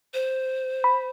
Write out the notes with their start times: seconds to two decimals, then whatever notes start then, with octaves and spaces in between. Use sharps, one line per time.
0.14 C5
0.84 B5